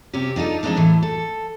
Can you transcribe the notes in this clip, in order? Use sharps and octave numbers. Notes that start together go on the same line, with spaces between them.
C3 C4 C#4 G4
D4 D#4 F4 A4
F3 G#3 A3 C4 D4 D#4
A2 E3 A3
A4